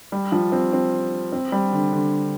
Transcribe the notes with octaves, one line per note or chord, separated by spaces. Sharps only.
G3
F3
C4
C4
C4
G3
D3
D3